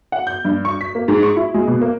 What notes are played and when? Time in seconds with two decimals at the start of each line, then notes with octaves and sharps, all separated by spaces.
0.12 F#5
0.27 G6
0.45 G2
0.65 C#6
0.81 B6
0.95 A#3
1.08 G#2
1.23 C#6
1.36 E4
1.54 G#3
1.67 B2
1.82 A#3